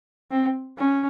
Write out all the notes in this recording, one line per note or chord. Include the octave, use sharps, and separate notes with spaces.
C4
C#4